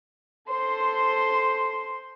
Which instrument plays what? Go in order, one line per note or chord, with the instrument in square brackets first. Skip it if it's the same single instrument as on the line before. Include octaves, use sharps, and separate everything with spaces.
[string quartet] A4 C5 C6